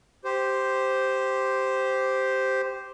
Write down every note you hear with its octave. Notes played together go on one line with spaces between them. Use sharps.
G4 C5